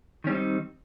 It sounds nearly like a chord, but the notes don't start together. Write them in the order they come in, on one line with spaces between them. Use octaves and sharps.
D#3 C#4 G3 C4 D#4